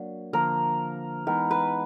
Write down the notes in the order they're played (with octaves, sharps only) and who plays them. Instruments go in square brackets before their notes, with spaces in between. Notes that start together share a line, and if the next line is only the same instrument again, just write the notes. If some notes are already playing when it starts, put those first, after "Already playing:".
Already playing: [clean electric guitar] F#3 A#3 D4 F#4
[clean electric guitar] D3 F3 A#3 [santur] A#4
[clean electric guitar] E3 G#3 B3 D#4 [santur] A#4
[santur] B4